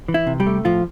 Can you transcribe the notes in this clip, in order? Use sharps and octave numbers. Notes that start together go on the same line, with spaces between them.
E3
E4
C3
G3 G4
A3
A2 F3 F4